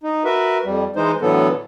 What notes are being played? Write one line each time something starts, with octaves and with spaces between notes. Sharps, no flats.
D#4
F#4 A#4 B4 E5
F2 G3
E3 G#3 D#4 C5
A2 D3 E3 F#3 B3 A4